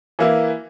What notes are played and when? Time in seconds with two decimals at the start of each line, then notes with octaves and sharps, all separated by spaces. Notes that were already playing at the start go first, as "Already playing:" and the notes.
0.19 E3 A#3 E4